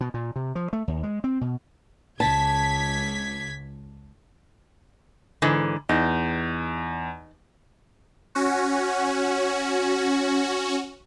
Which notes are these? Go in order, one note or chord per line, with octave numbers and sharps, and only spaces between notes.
B2
A#2
C3
F3
A3
D#2
G#3
C4
B2
C#2 A5 G#6 B6
G#2 D3 E3
E2 D#4
C#4 F#4